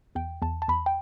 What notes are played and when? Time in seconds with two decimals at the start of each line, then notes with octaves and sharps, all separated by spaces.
0.15 E2 G5
0.42 E2 A5
0.62 A5
0.68 E2 B5
0.86 G5